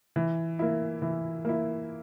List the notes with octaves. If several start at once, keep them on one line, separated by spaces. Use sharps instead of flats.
E3
A#3 E4
E3
A#3 E4